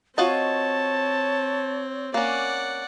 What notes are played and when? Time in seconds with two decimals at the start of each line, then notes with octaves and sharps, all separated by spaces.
0.18 C4 F4 F#4 C#5 D#5 A5
2.14 A#3 C#4 D5 F#5